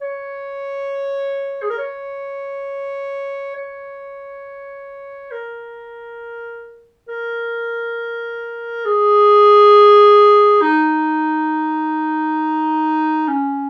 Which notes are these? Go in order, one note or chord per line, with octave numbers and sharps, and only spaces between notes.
C#5
G#4
A#4
C#5
C#5
A#4
A#4
G#4
D#4
C#4